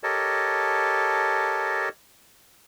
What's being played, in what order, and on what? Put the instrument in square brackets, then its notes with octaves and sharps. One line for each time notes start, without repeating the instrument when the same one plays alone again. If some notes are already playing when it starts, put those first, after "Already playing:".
[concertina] G4 A4 A#4 C#5 D#5 A5